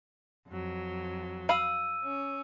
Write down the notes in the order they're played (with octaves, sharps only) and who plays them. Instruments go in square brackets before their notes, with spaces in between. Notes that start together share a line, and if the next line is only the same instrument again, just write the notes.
[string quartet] F2 F#3
[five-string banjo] F5 B5 [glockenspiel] E6 D#7
[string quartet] C#4